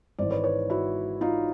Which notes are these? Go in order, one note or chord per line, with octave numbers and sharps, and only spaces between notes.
G#1 G#2 E3 C5 D5
B4 C#5
B4 C#5
E4 F#4
D#4 F4